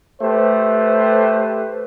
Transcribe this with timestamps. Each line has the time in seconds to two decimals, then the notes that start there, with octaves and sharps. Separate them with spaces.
0.22 A3 G4 B4 C5